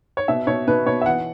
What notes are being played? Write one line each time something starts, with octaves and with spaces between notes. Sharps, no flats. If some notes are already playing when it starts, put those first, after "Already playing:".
C#5
B2 E5
B2 C#5
B2 B4
B2 C#5
E5
E3 F#5